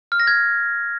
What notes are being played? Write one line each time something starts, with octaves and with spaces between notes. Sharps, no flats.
F6
A#6
G#6